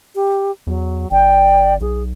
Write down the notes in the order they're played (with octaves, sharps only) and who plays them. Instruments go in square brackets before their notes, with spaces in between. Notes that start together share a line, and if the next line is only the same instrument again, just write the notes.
[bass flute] G4
[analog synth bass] E2 [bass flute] F#3
[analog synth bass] G1 [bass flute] D5 [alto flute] G5
[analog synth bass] B1 [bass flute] G#4